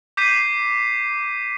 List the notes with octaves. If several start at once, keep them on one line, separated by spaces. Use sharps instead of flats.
D6 G6 B6 C7 D#7